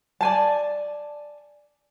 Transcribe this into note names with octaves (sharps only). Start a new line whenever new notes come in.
D5 G#5 A5